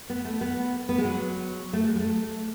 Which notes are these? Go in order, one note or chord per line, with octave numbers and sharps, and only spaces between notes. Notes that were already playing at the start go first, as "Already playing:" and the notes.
B3
A3
B3
B3
G#3
F#3
A3
G#3
G#3
A3